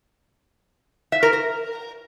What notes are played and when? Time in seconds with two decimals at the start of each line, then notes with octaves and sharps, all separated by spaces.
1.12 E5
1.23 A#4
1.33 A#4